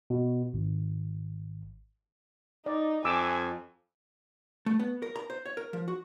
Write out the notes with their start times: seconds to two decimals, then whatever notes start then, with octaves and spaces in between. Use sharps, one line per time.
0.10 B2
0.54 G#1
2.66 D#4 D5
3.05 F2 G#5 D6 E6
4.66 A3
4.80 B3
5.02 A#4
5.16 A#5
5.30 C5
5.46 C#5
5.57 A#4
5.73 F3
5.88 F#4